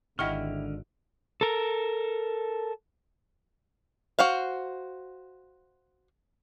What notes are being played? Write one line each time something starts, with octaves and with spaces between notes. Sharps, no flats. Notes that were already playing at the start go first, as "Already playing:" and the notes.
G#1 D3 E4 G4 D#5 F#5 C#6 F6
A4 A#4
F#4 C5 F5